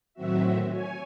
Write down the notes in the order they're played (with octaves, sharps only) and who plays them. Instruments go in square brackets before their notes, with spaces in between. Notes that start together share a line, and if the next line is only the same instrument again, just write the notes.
[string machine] A2 D#3 F#3 C4 F#4 E5
C#5 G#5